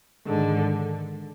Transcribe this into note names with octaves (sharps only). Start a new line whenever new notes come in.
G#2 D3 D#3 G#3